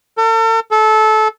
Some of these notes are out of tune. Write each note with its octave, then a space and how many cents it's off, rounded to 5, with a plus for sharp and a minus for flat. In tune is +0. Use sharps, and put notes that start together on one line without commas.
A4 +45
A4 -20